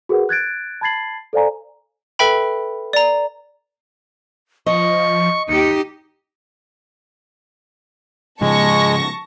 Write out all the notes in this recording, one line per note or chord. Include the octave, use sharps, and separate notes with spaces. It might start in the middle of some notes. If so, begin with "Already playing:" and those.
F#4 G#4 A#4 B4 F#5
F#6 G#6 A6 D7
A5 B5 G#6 A6 C7 F#7
A4 C5 D5 F5 G#5 A#5
A4 B4 E5 G5 B5
D5 A#5
F3 D#5 C#6
D#2 D#4 G4 C#7
G#2 C#3 F3 G#3 A5 C#6 A#6